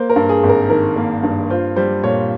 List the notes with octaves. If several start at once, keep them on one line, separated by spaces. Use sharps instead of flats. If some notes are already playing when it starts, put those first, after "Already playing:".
Already playing: A#3 C5
A#4
G2
G#4
G#1
A#4
D#3 A#4
A#3
G2
F4 C5
G3 C5
A#2 C#5